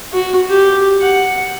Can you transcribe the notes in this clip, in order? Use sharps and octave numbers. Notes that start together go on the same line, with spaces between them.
F#4
G4
F#5